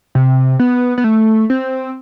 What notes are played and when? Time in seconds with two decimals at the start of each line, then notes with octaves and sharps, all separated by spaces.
0.15 C3
0.60 B3
0.98 B3
1.04 A3
1.50 C4